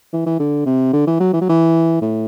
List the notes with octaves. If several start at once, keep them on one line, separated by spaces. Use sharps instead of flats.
E3
E3
D3
C3
D3
E3
F#3
E3
F#3
E3
A2